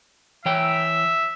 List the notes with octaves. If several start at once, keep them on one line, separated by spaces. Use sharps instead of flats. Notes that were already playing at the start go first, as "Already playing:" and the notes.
E3 C#5 E5 G5